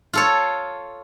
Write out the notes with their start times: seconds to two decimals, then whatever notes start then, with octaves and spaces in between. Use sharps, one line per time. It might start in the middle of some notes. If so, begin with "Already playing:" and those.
0.13 F4 A4 C#5